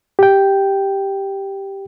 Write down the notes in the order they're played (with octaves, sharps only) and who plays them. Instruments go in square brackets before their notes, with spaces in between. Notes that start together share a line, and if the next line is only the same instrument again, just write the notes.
[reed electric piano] G4 G5